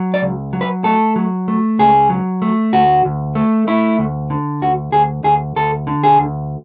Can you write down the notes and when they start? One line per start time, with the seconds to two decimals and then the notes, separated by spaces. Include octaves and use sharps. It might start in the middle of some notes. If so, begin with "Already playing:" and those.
Already playing: F#3
0.14 D5
0.22 C#2
0.53 F#3
0.61 B4
0.84 A3 A4
1.16 F#3
1.48 A3
1.79 C#2 G#4
2.10 F#3
2.42 A3
2.73 D2 F#4
3.05 D2
3.35 A3
3.67 A3 E4
3.99 D2
4.30 D3
4.62 D2 F#4
4.92 D2 G#4
5.24 D2 G#4
5.56 D2 A4
5.87 D3
6.03 G#4
6.19 D2